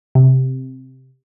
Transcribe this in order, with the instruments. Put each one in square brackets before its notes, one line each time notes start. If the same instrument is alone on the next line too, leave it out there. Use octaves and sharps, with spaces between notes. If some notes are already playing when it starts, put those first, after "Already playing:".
[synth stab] C3